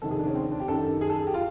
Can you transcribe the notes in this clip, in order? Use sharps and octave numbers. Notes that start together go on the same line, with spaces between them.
F2 C3 D#3 A4
G#4
D4
C#4
C4
D4
G4
F#2 D#3 A4
G#4
A4
G4
F4